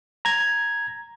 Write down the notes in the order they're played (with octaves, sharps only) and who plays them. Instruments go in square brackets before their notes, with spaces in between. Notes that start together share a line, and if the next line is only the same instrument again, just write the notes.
[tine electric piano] A#5 G#6